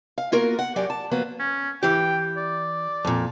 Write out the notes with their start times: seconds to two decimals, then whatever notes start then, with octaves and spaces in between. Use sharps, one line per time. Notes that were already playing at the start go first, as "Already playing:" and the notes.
0.18 F5
0.32 A#3 B3 F4 F#4 A#4
0.59 F#5
0.76 F#2 F#3 G4 D5
0.90 A5
1.11 F3 F#3 A#3 B3
1.40 C#4
1.83 E3 G4 G5
2.37 D5
3.05 F2 A#2